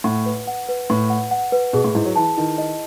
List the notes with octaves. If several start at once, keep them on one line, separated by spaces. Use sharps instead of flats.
A2 F#5
B4
F#5
B4
A2 B4
F#5
F#5
B4
B2 G#4
A2
G#2 E4
F#3
E3 A5
D#3 E4
D#5